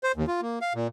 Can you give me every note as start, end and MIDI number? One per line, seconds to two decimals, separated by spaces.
0.04 0.12 72
0.16 0.26 39
0.27 0.41 65
0.42 0.59 58
0.61 0.73 77
0.75 0.87 46